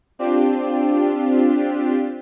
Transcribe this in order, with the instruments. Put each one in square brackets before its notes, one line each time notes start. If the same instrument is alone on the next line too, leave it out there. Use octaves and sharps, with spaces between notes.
[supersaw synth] C4 D4 F4 G4